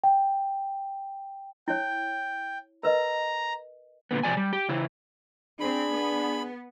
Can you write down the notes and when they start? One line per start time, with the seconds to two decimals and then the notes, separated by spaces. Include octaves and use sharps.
0.04 G5
1.68 E4 C#5 G5
2.83 A#4 B4 D#5 A#5
4.11 A#2 D3 B3
4.23 C3 F3 A#3 D5 G#5
4.37 G3
4.53 G4
4.69 C#3 E3 E4
5.60 C4 D4 G#4 B5
5.91 B3